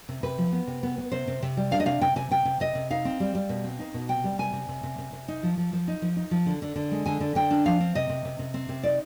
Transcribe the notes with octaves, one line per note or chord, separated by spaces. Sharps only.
C3
C3 B4
F3
B3
C3
B3
B3
C3 C5
C3
C3
G3
D4 F5
D#5
C3 F5
C3 G5
C3 G#5
C3 G5
C3
C3 D#5
C3
D#4 F5
C4
G3
G3
B2
C4
D#4
B2
C3 G5
G3
C3 G#5
C3
C3
C3
C3
C3
D#4
F3
F3
F3
D#4
F3
D#4
F3
D3
D3
D3
G#3
D3 G#5
D3
D3 G5
D4
F3 F5
C4
C3 D#5
C3
C3
C3
C4
C3
D#4 D5